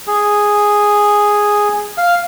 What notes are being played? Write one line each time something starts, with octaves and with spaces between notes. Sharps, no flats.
G#4
F5